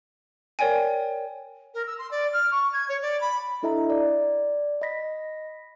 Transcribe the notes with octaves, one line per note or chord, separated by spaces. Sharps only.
A#4 C#5 D5 G5 G#5
A#4
E6
C6
D5
F6
C#6
G#6
C#5
D5
B5
D4 E4 A4 D#5 E5 A#5
D5
D#5 B5 A#6 B6